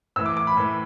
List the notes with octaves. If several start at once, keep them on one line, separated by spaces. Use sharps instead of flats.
A2 E3 E6
D6
D6
B5
A2 E3